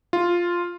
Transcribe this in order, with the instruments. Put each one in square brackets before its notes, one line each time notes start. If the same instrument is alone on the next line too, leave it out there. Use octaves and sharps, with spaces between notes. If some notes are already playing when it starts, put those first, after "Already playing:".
[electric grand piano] F4